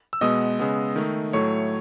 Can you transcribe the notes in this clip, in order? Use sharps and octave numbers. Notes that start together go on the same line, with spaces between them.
E6
B2 G#3 B3 D#5 D#6
C#3 G#3 B3
D#3 A3
A2 F#3 A3 C#5 C#6